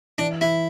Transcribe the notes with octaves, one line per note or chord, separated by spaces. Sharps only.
E3 D4
E3 E4